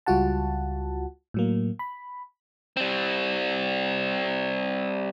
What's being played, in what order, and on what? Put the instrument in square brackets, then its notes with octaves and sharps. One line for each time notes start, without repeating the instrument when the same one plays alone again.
[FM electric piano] C#2 G3 F4 F#4 F#5 A5
A2 F#3 A#3
B5
[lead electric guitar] G3 C4